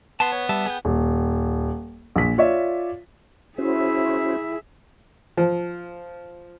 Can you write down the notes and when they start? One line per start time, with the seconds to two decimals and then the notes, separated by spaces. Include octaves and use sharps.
0.20 B3 A5 C6
0.32 C#5
0.49 G3 E5 A5
0.66 G#4 B4 G5
0.85 D#1
2.16 A#1 B6
2.38 F4 C#5 D5 E5
3.58 C#4 E4 F#4 G#4 C5 E5
5.37 F3